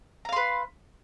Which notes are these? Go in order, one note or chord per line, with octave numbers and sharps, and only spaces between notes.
B4 F5 A#5 C6